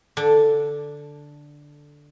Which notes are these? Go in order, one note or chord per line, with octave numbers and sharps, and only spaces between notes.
D3 D4